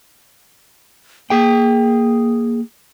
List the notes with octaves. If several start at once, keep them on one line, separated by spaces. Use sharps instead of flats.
A#3 G#4 G5